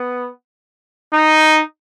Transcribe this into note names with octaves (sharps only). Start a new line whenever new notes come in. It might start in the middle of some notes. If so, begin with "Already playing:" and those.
Already playing: B3
D#4